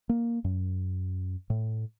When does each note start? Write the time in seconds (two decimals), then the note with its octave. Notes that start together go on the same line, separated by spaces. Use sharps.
0.09 A#3
0.44 F#2
1.50 A2